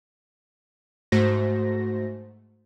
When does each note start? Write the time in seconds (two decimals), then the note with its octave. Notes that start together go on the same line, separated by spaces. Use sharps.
1.12 G#2 A3 F#4 C5 A#6